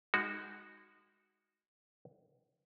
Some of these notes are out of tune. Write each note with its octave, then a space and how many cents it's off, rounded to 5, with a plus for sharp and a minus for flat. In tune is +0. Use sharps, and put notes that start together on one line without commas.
G#3 -25 D#4 +0 F#4 +0